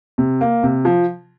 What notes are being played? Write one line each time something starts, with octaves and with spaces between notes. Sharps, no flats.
C3
A#3
C3
F3